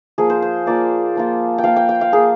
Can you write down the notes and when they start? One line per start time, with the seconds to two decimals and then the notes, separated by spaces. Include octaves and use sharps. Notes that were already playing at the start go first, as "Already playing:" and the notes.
0.18 F3 A#3 F4 G#4
0.30 C5
0.42 C5
0.66 F3 A#3 F4 D5
1.16 F3 A#3 F4
1.58 G5
1.64 F3 A#3 F4 F5
1.76 G5
1.89 G5
2.01 F5
2.12 A#3 F4 G#4